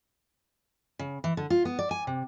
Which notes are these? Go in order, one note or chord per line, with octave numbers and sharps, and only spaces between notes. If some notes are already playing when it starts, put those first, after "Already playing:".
C#3
E3
D3
F4
B3
D5
G#5
C3